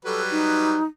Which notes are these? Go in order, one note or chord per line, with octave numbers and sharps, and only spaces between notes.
F#3 G3 A4 B4
D#4